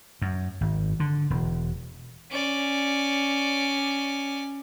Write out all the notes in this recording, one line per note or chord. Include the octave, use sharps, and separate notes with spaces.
F#2
G#1
D3
E1
C#4 D5